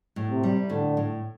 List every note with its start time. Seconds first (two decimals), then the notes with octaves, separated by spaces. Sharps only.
0.16 A2
0.30 C3
0.43 G3
0.70 A2 D3
0.97 A2